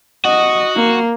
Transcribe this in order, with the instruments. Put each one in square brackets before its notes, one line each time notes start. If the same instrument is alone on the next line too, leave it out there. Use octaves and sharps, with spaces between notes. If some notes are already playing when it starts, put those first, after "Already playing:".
[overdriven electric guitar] F#4 [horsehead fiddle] D#5
[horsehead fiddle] A#3